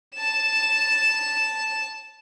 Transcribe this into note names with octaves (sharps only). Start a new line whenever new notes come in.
A5 E7